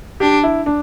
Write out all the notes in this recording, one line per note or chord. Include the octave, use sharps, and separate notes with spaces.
D4 G4
E4
D4